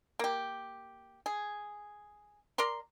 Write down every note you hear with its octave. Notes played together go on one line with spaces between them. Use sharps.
A#3 G4
G#4
A#4 D5 A#5 C6